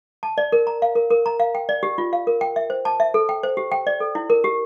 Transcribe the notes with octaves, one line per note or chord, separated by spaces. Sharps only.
A5
D5
A#4
A#5
F5
A#4
A#4
A#5
F5
G5
D5
G4
F4
F5
A#4
G5
E5
C5
A5
E5
A4
G5
C5
G4
G5
D5
A4
E4
A#4
G4